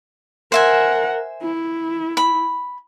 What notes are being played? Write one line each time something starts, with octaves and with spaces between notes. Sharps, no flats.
A#4 C5 E5 F#5 G#5
E4
B5